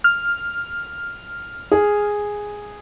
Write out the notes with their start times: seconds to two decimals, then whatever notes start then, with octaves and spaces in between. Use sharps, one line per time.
0.04 F6
1.72 G#4